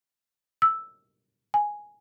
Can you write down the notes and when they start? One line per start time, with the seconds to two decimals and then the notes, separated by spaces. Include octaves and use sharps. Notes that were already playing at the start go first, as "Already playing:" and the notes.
0.62 E6
1.54 G#5